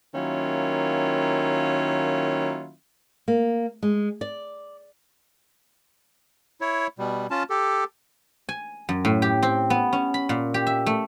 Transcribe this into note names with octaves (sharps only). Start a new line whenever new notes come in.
D#3 F#3 A#3 C#4 E4 F4
A#3
G#3
D5
E4 C#5
B2 G3
C#4 F4 A5
G4 A4
G#5
F#2
A2
G4
C4
B3
C#4
B5
A#2
G4
E5
A3